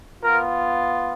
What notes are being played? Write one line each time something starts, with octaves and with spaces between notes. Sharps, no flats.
B3 F4 A#4